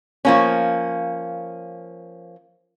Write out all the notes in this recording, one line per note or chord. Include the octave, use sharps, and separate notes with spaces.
F3 A#3 C#4